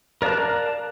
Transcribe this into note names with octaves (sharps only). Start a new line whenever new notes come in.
A#4 D5 F5 A5 F#6